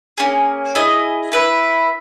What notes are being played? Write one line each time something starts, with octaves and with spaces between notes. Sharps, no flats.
A#3 C#4 G#4
E4 G#4 D#5
E4 B4 E5